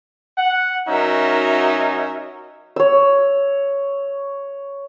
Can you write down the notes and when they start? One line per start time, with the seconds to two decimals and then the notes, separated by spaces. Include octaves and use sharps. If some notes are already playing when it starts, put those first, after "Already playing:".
0.38 F#5
0.88 F#3 C#4 D#4 F#4 A#4 E5
2.76 C#5 E6